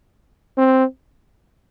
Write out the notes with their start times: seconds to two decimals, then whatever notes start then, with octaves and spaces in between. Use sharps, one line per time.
0.57 C4